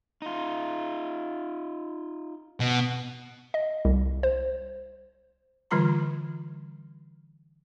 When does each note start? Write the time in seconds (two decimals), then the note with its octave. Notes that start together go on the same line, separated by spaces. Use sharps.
0.22 D#4 F4
2.60 B2
3.54 D#5
3.85 C2
4.23 C5
5.71 D3 E3 G3 F4 A#5 C6